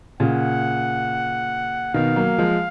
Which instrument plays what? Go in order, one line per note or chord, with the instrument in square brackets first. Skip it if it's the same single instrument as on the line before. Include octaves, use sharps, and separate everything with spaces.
[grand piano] A#2 C#3 [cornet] F#5
[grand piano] B2 D#3 [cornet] F5
[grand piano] F#3 A#3
F3 G#3